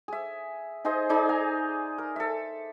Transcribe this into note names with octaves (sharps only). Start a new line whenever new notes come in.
G#4 E5
D#4 G#4 C5 D#5
D#4 G#4 D5
G#5 A#5
A#4
A4 E5